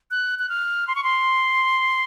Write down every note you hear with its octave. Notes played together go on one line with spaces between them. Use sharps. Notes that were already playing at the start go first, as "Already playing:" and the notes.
F#6
F#6
F6
C6
C#6
C6